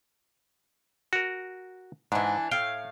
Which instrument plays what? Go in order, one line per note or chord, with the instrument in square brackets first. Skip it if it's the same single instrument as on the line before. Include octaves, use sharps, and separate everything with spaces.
[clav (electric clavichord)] F#4 A#4
[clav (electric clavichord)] G#2 [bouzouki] E3 D4
[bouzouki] A2 F5 [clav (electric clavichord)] G5